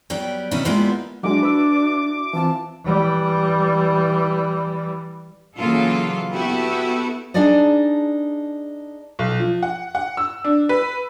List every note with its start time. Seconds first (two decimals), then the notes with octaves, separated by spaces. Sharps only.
0.10 F#3 G3 B3 G5
0.51 B2 D#3 C#4 D#4 E4
0.65 G3 G#3 A#3 B3 E4 F4
1.23 F#3 G#3 D4 E4 F#4 D6
1.43 B4 E6
2.33 E3 C4 F4 A5
2.84 E3 G3
5.57 C#3 E3 F#3 A#3 F4 A4
6.31 B3 E4 F#4 G4 A4 B4
7.34 D4 D#4 G#4 A4 D5 D#5
9.19 B1
9.40 F3
9.63 F#5
9.95 F#5
10.17 E6
10.44 D4
10.69 B4